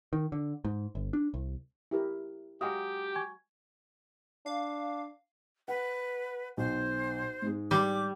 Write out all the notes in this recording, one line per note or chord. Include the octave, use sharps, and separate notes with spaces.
D#3
D3
G#2
G1
D4
C2
E4 G4 A#4
F#3 G#3 G4 F5 D#6
G#5 C#6 G#6
D4 F5
B4 F#5
B1 C5
G#2 G#3
G3 D6